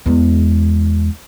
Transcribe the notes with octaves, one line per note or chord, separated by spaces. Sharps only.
E2 G#3